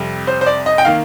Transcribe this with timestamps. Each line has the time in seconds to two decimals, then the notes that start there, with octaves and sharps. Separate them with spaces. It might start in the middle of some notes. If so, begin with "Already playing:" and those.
Already playing: F2 C3 G3
0.27 C5
0.41 C5
0.46 D5
0.66 D#5
0.78 G5
0.85 D#3 A#3 F5